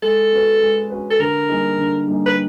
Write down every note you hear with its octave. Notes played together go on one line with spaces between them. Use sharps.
G#3 A4
C#4 F#4 B4
G#3
C#4 F#4 B4
A4
D3 A#4
G3 A#3 D#4 G#4
D3
G3 A#3 D#4 G#4
B4